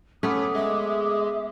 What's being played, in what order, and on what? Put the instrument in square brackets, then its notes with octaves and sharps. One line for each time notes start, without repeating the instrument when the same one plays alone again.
[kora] A3 B3 [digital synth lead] C#4 [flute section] D6 D#6
[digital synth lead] G#3 [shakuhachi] E5